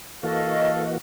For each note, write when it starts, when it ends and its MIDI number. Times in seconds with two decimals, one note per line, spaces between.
0.23 0.98 52
0.23 0.98 58
0.23 0.98 66
0.23 0.84 69
0.23 0.88 75
0.23 0.84 77